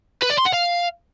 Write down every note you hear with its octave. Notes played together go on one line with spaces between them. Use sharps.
B4
D5
C6
F#5
F5